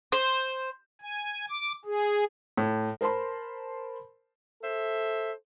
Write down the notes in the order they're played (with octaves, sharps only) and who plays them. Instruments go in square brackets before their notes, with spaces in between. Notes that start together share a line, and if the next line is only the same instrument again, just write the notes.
[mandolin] C5
[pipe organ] G#5
D6
G#4
[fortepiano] A2
[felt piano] A#4 C5 A5 B5 C6
[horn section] A4 C5 E5